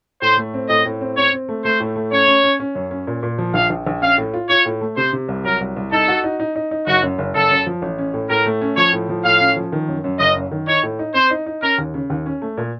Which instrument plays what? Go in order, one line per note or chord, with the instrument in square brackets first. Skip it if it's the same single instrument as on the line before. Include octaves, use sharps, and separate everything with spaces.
[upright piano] A2 [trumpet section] C5
[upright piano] A3
C4
[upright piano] A2 [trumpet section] D#5
[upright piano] A2
C4
[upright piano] C4 [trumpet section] C#5
[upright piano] C4
A3
[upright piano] A3 [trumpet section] C5
[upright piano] A2
A3
[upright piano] C#4 [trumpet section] C#5
[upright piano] C#4
C#4
C#4
F#2
C#4
A#2
A#2
F3
[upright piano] A#1 [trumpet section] F5
[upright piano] A#1
A#1
[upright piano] C#4 [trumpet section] F5
[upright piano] A2
F4
[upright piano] F4 [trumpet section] C#5
[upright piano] A2
A3
[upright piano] C3 [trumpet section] C5
[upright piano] C3
C2
[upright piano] F#3 [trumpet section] A#4
[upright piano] C2
C2
[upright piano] D#4 [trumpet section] A4
[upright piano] F#4
D#4
D#4
D#4
D#4
[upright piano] F#1 [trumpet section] F#4
[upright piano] F#2
F#1
[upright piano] F#1 [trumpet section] A4
[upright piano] F#2
F3
A1
C#4
A2
[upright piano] A2 [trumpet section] A#4
[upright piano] A3
C#4
[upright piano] F3 [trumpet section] C#5
[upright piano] A2
F3
[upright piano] A2 [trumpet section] F5
[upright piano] C#4
F3
D#3
F#2
F#2
[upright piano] F#1 [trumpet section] D#5
[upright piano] F#2
D#3
[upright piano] D#4 [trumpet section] C#5
[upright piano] A2
D#4
[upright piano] C4 [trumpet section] C5
[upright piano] D#4
D#4
[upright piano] C#4 [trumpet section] A#4
[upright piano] D#2
C#3
D#2
C#4
A3
A#2